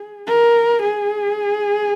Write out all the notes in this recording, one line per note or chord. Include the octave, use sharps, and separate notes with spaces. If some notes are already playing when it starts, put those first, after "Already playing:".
Already playing: G#4
A#4
G#4